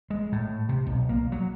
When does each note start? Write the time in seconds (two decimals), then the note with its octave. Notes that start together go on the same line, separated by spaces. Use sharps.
0.10 G#3
0.32 A2
0.69 C3
0.87 B1
1.09 A#3
1.32 F#3